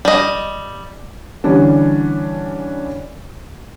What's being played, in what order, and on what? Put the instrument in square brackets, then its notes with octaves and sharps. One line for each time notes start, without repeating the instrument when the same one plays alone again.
[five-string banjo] G3 D#5
[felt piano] D3 E3 G3 C#4 D4